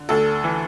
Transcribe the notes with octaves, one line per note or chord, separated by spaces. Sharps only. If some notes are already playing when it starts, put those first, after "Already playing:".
Already playing: D3
D2 A4
E3